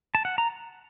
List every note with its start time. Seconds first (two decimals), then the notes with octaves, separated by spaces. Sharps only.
0.15 A5
0.25 F#5
0.38 A#5